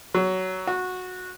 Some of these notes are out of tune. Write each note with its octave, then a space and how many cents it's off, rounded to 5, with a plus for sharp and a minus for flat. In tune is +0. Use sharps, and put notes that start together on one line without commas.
F#3 +15
F#4 -15